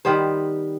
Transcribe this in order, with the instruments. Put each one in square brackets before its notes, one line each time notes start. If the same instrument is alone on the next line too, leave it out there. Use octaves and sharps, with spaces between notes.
[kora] D#3 G3 B3 C5